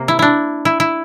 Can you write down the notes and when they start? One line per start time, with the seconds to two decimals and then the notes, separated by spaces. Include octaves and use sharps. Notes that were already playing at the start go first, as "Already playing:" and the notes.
Already playing: C3 A#3
0.08 E4
0.19 D4 E4
0.65 E4
0.80 E4